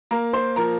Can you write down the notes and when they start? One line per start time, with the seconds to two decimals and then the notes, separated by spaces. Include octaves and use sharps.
0.11 A#3 A#4 A#5
0.33 C5 C6
0.56 F3 A#4 A#5